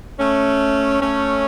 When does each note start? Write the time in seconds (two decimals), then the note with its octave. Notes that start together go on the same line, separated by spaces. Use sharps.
0.19 A3 C#4
1.01 A3 C#4